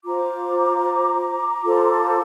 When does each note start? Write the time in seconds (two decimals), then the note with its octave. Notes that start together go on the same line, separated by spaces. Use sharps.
0.05 F4 C5 A#5 D6
1.63 F4 A4 C5